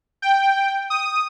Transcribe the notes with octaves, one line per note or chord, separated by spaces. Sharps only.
G5
D#6